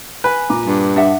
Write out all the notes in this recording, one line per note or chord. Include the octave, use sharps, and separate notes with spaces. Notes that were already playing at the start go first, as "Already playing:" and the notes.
B4 G#5
A#2 A#5 D6
G2
D4 E5 F#5